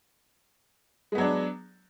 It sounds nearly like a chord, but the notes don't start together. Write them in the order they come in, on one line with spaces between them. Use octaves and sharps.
G#3 B3 F#3 D4